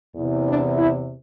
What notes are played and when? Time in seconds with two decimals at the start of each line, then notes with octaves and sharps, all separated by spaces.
0.16 E2 C3 E3
0.47 D4
0.77 E4